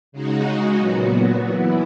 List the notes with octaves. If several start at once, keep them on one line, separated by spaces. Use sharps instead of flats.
C#3 G#3 D#4 F#4
A#2 F#3 B3 F#4
E3 B3 E4